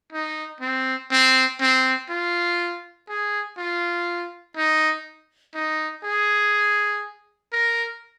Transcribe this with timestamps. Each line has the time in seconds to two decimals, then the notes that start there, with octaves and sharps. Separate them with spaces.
0.12 D#4
0.61 C4
1.11 C4
1.60 C4
2.09 F4
3.08 G#4
3.57 F4
4.56 D#4
5.54 D#4
6.04 G#4
7.52 A#4